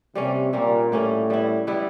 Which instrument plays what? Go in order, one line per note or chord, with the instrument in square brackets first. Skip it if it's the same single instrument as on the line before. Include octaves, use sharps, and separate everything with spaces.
[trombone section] C3 [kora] G3 A#3 C#4
[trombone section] A#2 [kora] G3 A#3 C#4
[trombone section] A2 [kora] G3 A#3 C#4
[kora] G3 B3 E4
G3 B3 E4